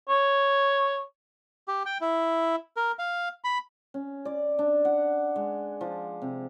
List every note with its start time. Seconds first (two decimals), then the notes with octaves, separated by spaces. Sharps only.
0.09 C#5
1.68 G4
1.86 G5
2.01 E4
2.77 A#4
2.99 F5
3.44 B5
3.94 C#4
4.25 D5
4.59 D4
4.85 F#5
5.36 G#3
5.81 F3
6.22 C3